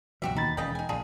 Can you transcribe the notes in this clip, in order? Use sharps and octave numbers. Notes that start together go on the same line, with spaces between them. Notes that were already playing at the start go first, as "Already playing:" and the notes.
C#2 G2 B2 E3 F#3 F#4 G4 E5
D#2 D#4 B5 A6
E1 C#3 D#5 G5 B5
D#4 G#5
A#1 A#2 D4 F4 G#4